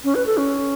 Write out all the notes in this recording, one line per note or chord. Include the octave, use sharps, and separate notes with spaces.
C#4
B4
A4
C#4